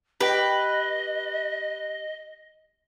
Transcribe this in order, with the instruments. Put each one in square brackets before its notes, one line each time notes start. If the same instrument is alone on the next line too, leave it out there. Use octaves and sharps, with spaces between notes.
[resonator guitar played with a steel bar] G4 G5 [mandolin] B4 [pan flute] D#5